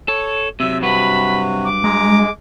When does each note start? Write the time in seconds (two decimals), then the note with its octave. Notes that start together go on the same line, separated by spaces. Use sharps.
0.08 A4 C#5
0.60 C3 F#3 E5 E6
0.82 G2 C3 F#3 F#4 B4 B5
1.64 D6
1.84 G#3 A#5